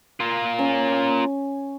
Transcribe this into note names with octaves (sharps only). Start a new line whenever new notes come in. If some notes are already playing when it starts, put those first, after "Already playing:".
A#3 F4
C#4